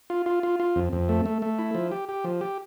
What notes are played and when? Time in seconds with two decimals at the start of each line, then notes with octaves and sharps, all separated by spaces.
0.10 F4
0.26 F4
0.43 F4
0.60 F4
0.76 F2
0.93 F2
1.09 A3
1.26 A3
1.42 A3
1.59 E4
1.75 F3
1.92 G4
2.09 G4
2.24 F3
2.41 G4